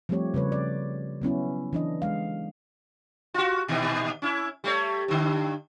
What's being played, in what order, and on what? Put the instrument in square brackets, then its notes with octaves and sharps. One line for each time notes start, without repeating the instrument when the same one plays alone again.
[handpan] F3 G3 A3 C4 G4 C#5
C#3 G3 B4 C#5
D5
F#3 B3 C#4 E4
E3 D4 D#5
G#3 F5
[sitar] F4 F#4
A#2 D#3 E3
C#4 E4
G3 A3 C#5
G2 D3